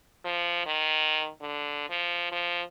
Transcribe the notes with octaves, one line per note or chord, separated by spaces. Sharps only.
F3
D#3
D3
F3
F3